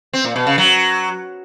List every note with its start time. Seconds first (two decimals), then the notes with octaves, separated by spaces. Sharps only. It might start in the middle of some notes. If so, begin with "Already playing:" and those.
0.13 C4
0.25 A#2
0.36 B2
0.47 C#3
0.58 F#3